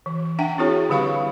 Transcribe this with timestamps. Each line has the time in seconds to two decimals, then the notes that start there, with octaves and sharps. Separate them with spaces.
0.06 E3
0.39 D4 E5 F#5 G5
0.58 C4 E4 F#4 G#4 C#5
0.90 D3 G3 G4 F5 B5 C#6